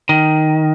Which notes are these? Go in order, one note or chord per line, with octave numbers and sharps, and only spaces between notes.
D#3